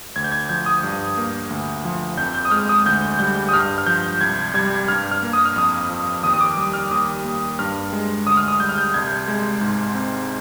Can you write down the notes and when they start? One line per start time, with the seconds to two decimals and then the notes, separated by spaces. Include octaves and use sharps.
0.16 D2 G#6
0.24 G6
0.32 G#6
0.49 F3 G6
0.66 D#6
0.83 G2
1.17 A#3
1.50 D2
1.85 F3
2.18 F2 G6
2.34 G6
2.45 D#6
2.51 G#3 F6
2.69 D#6
2.86 D2 G6
3.19 G3 G6
3.49 D#6
3.53 G2 F6
3.78 F6
3.87 F3 G6
4.21 C2 G#6
4.54 G3 G#6
4.88 G2 F6
5.11 F6
5.23 A#3
5.33 D#6
5.45 F6
5.56 F2 D#6
5.90 F3
6.23 D#2 D#6
6.34 D#6
6.41 D6
6.57 G3 D#6
6.74 F6
6.91 D#2 D#6
7.24 A#3
7.59 G2 F6
7.93 G#3
8.26 D2 D#6
8.37 F6
8.48 D#6
8.59 G3 G6
8.69 F6
8.78 G6
8.94 C2 G#6
9.28 G#3
9.61 G#2
9.95 C4